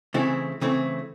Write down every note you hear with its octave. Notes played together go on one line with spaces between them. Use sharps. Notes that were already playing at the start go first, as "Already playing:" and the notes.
C#3 E3 A3 C4 E4
C#3 E3 A3 C4 E4